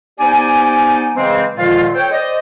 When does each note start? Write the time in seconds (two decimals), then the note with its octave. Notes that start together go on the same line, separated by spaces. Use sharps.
0.20 B3 D#4 G4 C5 D5 G#5
1.15 C#3 E3 G#3 C4
1.57 A#2 D3 D#3 F3 G#3 F4
1.94 A4 C5 C#5 G5
2.11 C5 D5 D#5